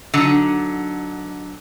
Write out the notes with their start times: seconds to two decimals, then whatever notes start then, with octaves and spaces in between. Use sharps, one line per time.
0.14 D3 F#3 D#4